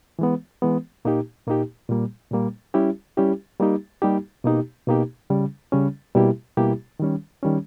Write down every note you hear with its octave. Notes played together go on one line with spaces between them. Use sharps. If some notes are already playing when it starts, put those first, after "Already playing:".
E3 G#3 B3
E3 G#3 B3
A#2 A#3 D#4 G4
A#2 A#3 D#4 G4
A#2 G3 A#3
A#2 G3 A#3
G3 C#4 E4 G4
G3 C#4 E4 G4
G3 A#3 D#4 G4
G3 A#3 D#4 G4
B2 A#3 D#4 G4
B2 A#3 D#4 G4
C#3 G3 C#4
C#3 G3 C#4
B2 G3 A#3 E4 G4
B2 G3 A#3 E4 G4
D#3 G3 C#4
D#3 G3 C#4